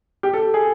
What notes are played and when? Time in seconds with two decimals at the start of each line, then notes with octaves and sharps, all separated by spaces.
0.23 G4
0.34 A4
0.54 G#4